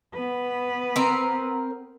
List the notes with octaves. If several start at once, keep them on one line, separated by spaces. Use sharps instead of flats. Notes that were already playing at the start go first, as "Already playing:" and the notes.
B3 B4
C4 A#4